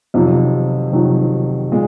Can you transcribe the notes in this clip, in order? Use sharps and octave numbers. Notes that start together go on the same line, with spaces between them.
F2 C3 D#3 F#3
F2 C3 D#3 F#3
A#2 G#3